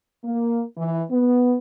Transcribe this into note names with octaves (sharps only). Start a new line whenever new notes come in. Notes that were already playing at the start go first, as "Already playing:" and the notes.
A#3
E3
B3